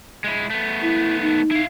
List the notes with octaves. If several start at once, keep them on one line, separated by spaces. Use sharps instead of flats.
G#3 E4
A3 B3
E4
D#4
E4 F5